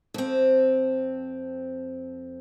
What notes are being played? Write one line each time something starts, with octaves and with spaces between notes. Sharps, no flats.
F2 C4